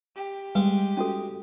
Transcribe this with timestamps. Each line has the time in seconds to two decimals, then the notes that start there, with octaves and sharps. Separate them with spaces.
0.16 G4
0.55 G3 G#3
0.97 C#4 F#4 A4